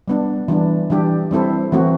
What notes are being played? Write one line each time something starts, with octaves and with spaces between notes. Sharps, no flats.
G3 B3 D4
E3 G3 D4
E3 G3 D4 G4
G3 C4 E4 A4 C5
E3 A3 C4 F#4